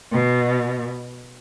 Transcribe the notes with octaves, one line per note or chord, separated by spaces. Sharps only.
B2